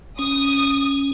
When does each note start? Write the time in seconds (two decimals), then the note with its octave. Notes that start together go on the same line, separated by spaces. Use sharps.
0.19 C#4 D#6